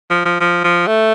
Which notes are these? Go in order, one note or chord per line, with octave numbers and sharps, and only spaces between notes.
F3
F3
F3
F3
A3